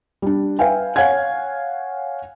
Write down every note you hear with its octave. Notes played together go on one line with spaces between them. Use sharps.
G3 D4
B4 E5 F5 G5 G#5
C#5 F5 F#5 G#5 G#6